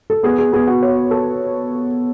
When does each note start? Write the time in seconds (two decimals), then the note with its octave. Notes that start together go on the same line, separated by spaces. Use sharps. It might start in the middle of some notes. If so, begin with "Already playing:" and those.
0.10 A4
0.23 B3 G#4
0.38 G#4
0.52 B3 G#4
0.67 F#4
0.83 C#5
1.11 A4